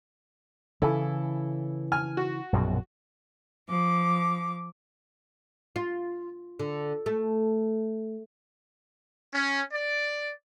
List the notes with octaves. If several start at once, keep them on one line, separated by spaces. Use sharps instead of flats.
C#3 E3 E4 A4
G#5 F6
F#4
A#1 F#2 B2
F3 D6
F4
D3
A3
C#4
D5